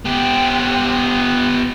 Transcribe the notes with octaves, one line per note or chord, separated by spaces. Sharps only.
B3 G4